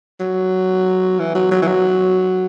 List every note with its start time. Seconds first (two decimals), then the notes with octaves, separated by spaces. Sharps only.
0.20 F#3
1.19 E3
1.35 F#3
1.51 F#3
1.62 E3
1.67 F#3